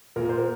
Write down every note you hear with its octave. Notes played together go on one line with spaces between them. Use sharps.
A#2 A#4
C5
A#4